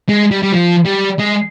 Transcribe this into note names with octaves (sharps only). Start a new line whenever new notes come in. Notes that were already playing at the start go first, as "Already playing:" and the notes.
G#3
G3
G3
F3
G3
G#3